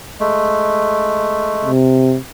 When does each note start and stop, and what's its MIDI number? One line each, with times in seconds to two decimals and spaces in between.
0.20 1.71 56
0.20 1.71 57
1.66 2.17 48